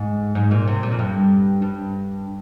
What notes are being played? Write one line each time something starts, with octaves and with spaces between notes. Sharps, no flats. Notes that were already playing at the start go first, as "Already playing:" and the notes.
Already playing: G#2
G#2
A#2
C3
A#2
F2
G2
G2